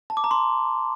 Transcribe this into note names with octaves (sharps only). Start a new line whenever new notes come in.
A5
D6
A#5
C6